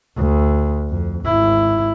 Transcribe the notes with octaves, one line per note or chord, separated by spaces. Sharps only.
D2
F2
G#1 E4